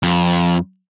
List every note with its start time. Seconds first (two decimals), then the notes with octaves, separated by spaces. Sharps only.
0.03 F2